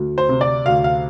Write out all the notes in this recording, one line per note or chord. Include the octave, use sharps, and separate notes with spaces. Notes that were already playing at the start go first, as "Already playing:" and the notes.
Already playing: D2
C5
C3
D5
D2 F5
F5